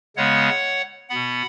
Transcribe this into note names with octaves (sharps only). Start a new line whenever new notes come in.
C#3 G#3 B3 C#5 F#5
B2 B3 F#5 B5